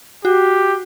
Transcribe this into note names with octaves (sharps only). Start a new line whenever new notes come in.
F#4 G4